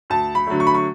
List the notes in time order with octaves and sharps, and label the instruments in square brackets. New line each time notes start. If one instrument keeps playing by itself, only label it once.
[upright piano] D2 A5
B5
D3 F#3 A3
C#6
B5
C#6